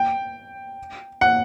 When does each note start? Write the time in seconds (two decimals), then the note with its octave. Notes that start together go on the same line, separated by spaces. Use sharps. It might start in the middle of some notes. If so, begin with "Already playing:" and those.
Already playing: G5
1.21 F#5